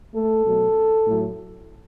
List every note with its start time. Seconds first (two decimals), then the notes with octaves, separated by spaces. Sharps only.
0.13 A3 A4
0.45 B2 F#3 A3
1.07 A2 F#3 A3